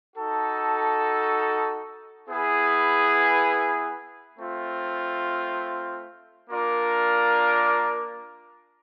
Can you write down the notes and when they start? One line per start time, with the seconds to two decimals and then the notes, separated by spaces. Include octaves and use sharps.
0.16 D#4 F#4 A4
2.27 B3 E4 G#4 B4
4.38 A3 C4 F4
6.49 A#3 D4 F4 A#4 D5